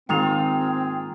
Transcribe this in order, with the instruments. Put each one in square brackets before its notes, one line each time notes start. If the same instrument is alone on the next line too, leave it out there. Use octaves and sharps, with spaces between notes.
[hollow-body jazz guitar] G#2 D#3 [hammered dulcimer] A#3 F4 G#4 [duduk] C4 [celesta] G5 F7